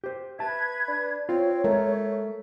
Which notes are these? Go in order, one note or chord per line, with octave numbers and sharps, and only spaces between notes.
G4 C5
B4 E5 A5 G#6
D4
C4 F4 C#5
G#3 A3 A#4